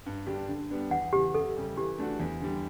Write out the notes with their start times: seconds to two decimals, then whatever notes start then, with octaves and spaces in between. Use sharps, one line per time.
0.06 G2
0.27 D3 G3 D4 G4
0.48 D3
0.70 G3 B3 D4
0.91 E2 F#5
1.13 C#3 G4
1.15 E3
1.34 F#2 A4
1.56 C#3 G3
1.77 E3 G4
1.98 A3 D4 F#4
2.20 E2
2.41 D3 G3